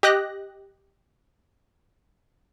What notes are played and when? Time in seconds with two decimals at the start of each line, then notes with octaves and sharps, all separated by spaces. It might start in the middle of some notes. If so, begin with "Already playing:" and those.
0.03 G4 D#5 F#6 A#6